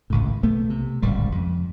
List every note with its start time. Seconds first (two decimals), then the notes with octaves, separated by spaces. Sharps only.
0.10 G#1 C#2 A2
0.43 B1 A3 B3
0.70 C3
1.02 D1 G#1 C#2 G3
1.32 F2